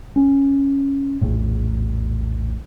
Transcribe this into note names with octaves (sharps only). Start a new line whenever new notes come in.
C#4
A#1 E2 A2